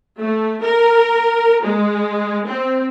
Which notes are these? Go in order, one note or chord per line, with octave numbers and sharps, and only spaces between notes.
A3
A#4
G#3
C4